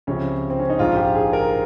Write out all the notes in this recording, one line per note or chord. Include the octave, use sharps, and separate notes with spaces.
C#2 C3 F3 C#4
C4
C#4
D#4
A#1 G#2 F3 F4
G4
G#4
A#4